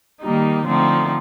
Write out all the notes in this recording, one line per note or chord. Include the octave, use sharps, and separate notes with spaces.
D#3 G3 A#3 D#4
D3 F3 A3 C4 D#4